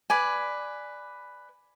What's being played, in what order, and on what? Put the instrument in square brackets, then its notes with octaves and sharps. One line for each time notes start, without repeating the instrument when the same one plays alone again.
[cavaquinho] B4 D5 G#5